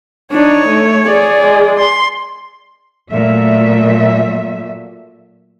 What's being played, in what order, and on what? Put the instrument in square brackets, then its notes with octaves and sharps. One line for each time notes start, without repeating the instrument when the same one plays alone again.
[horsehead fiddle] D4 D#4 [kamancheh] C#5
[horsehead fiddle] A3
G#4 D5
[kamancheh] G#3
C6
[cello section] A#2 F#3 A3 E5